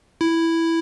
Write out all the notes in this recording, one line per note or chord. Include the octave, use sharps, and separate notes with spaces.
E4